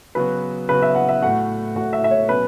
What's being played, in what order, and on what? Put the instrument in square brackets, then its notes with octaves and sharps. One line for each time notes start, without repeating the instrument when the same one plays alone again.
[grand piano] C#3 F#3 B3 F#4 [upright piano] B4
[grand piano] C#3 F#3 B3 F#4 [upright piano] B4
[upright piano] E5
F#5
E5
[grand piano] A2 A3 F#4 [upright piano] F#5
[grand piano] A2 A3 F#4 [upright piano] F#5
[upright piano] E5
E5
C#5
[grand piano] B2 F#3 C#4 [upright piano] B4